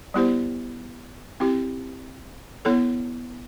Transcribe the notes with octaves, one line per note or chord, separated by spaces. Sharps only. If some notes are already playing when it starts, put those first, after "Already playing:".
G3 B3 E4 G4 C5
C4 E4 G4
B3 E4 A4 C#5